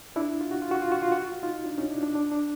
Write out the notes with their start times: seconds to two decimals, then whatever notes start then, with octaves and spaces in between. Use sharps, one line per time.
0.16 D4 E4
0.41 F4
0.51 F#4
0.62 F4
0.71 F#4
0.82 F4
0.92 F#4
1.02 F4
1.12 F#4
1.22 F4
1.32 F#4
1.43 D#4 F4
1.66 D4
1.78 C#4 D#4
1.90 D4 E4
2.03 D4
2.15 D4
2.32 D4